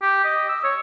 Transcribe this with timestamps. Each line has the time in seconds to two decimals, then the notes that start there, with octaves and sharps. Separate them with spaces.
0.02 G4
0.24 D#5
0.49 E6
0.64 C#5